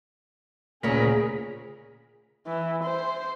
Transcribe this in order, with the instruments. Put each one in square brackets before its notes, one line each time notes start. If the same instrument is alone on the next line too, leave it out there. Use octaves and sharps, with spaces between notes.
[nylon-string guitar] D2 A#2 C#5 [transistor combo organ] C#3 A#4 B5 [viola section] G#4
[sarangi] E3
C5